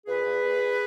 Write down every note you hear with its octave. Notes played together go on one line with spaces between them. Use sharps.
A#2 G#4 B4
A#2
A#2
A#2